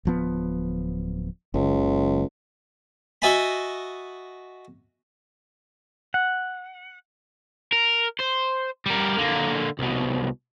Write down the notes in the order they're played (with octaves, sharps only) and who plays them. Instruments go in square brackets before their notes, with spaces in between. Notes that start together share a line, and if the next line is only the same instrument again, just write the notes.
[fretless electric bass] D1 F3 B3
[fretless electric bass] F#1 [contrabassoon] C#2
[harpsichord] F#4 D#5 E5 G#5 A5 B5
[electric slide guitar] F#5
[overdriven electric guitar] A#4
C5
G3 A#4
D3 A#3
C2 B2